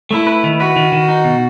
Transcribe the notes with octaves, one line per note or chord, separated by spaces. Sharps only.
A3 E4
B4
D#3
F#4 B4
D#3
D#3
D#4
B2